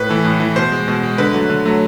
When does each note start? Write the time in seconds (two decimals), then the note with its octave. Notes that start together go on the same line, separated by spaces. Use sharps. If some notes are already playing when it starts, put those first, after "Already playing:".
Already playing: A2 B4
0.09 E3 A3
0.25 A2
0.40 E3 A3
0.56 B2 C5
0.72 G#3
0.88 B2
1.03 G#3
1.18 D3 B4
1.34 F#3 A3
1.50 D3
1.65 F#3 A3